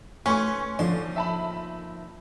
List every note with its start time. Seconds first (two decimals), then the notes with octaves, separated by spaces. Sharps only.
0.26 A3 C#4 B4 G#5 C6 C#6
0.79 D3 F3 A#3 D4 D#4 C6
1.16 E5 A5 B5